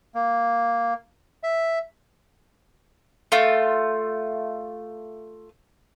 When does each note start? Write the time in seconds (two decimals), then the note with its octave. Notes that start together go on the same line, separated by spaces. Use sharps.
0.15 A#3
1.43 E5
3.32 A3 F4